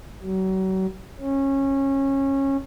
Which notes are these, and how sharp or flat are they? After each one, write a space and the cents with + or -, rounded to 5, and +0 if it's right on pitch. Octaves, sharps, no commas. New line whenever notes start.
F#3 +35
C#4 -20